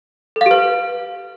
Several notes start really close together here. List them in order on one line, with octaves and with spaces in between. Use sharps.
A4 F5 G4 B4